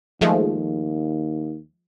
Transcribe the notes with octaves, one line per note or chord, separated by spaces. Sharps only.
D#2 F3 G#3 A3